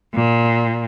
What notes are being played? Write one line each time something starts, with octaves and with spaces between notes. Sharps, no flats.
A#2